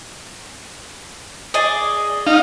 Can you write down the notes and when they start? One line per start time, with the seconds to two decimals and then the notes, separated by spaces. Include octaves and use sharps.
1.54 G#4 D5 D#5
2.27 D#4 F5